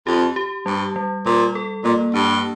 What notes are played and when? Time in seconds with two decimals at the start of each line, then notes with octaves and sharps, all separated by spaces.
0.07 F2 G4
0.36 G4
0.66 G2 G3
0.96 G3
1.26 A#2 G3
1.55 A4
1.84 A#2 A#3
2.14 G2 D4